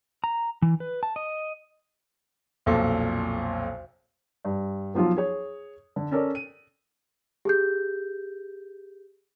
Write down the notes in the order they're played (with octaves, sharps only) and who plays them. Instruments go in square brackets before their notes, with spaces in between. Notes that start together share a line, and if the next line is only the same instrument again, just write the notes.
[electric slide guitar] A#5
E3
B4
A5
D#5
[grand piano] B1 F2 A#2 A4
[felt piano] G2
B1 F3 F#3 F4
G#4 C#5
D3
C#4 A4 A#4 C#5 D5
D#7
[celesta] G4 G#4 G6